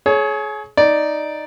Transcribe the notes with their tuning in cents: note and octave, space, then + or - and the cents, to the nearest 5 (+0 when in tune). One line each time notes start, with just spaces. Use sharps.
G#4 +35 C#5 +0
D#4 +0 D5 +0